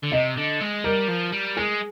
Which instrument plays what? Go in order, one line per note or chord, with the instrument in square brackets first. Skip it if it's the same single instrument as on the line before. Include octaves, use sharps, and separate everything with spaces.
[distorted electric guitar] D3
[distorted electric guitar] C3 [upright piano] D#5
[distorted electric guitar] D3
G#3
[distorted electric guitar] G3 [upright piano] A#4
[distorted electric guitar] F3
G3
[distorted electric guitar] G#3 [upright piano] G#4